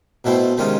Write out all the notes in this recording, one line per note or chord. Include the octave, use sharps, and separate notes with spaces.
B2 F#3 A3 C4 E4
C3 D#3 G#3 C#4 F4